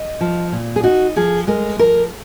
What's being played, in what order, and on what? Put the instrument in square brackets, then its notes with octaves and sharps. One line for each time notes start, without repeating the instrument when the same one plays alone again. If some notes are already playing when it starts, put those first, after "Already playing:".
Already playing: [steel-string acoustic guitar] D#5
F3
A#2
G#4
D#4 F#4
F3 G#4
G#3 A#4
F3 A#4